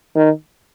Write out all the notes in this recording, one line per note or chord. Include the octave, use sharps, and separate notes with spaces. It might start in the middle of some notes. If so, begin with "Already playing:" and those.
D#3